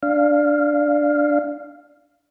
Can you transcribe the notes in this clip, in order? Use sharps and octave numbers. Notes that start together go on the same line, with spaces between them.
D4 F5